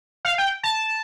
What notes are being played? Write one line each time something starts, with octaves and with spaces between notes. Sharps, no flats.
F5
G5
A5